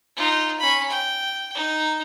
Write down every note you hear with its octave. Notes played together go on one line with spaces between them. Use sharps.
D#4 F4
C#4 B5
G5
D#4